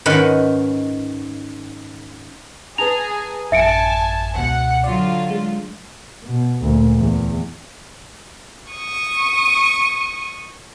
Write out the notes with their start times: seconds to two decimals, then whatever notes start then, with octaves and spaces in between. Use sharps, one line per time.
0.06 G#2 D#3 C#4 B4 D#5 F#5
2.78 G#4 B4 A5 A#5 F7
3.52 A1 F#2 E5 G#5 A5 C#7 D7
4.36 C#2 B2 F#5
4.84 D3 F#3 F4 D5
5.30 G#3
6.24 B2
6.61 D2 A#2
6.95 E2
8.72 C#6 D#6